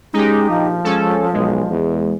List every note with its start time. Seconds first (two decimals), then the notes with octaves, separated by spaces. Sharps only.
0.14 G#3 C#4 D#4 G4
0.50 A#1 F3
0.84 G#3 C#4 A4
1.34 B1 G#3
1.71 E2